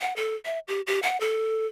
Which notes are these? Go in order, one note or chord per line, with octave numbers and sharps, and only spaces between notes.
F#5
A4
E5
G4
G4
F#5
A4